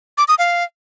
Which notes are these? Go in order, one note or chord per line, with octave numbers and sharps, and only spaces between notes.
D6
D#6
F5